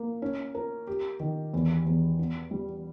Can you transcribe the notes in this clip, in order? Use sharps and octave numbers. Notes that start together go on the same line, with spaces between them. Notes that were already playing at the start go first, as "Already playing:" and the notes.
Already playing: A#3
C#4
A#4
G4
D#3
E2
E2
B3
G3